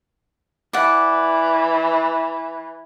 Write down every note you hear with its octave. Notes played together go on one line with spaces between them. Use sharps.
E3 D5 F#5